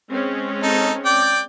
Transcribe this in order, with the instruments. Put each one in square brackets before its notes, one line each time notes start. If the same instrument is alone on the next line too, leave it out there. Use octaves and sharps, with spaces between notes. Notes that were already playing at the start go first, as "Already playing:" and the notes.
[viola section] G#3 C4 C#4
[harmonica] D#4 A4
D5 G5